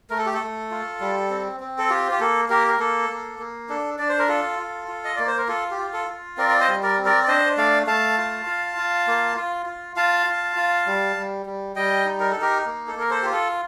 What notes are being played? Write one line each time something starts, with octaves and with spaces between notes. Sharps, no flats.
A3 A#4
A4
G4
A4
A3
F4
G3
C4
C4
A4
F4 G4
G4
A#3 A4
A#3 G4 A#4
A#4
A#3 A4
A#3
A#3
D4 A4
D4 D5
C5
A#4
F4 A4
F4
F4
D#5
A#3 D5
C5
A#4
F4 A4
G4
F4
A4
F4
C4 A#4 D5
D5
C5 D#5
G3
A#4 D5
C4
A#4 D5
D5
D4 C5 D#5
A3 D5 F5
A3 F5 A5
F4
F4
F4
A#3
F4
F4
F4 F5 A5
F4
F4
G3
G3
G3
G3 D#5 G5
D#4
A#4
D#4 A4
G4 A#4
A#3
A4
A#3 A#4
A4 C5
F4 G4
A4